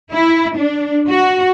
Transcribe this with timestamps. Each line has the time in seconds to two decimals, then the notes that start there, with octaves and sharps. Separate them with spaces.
0.11 E4
0.57 D4
1.09 F#4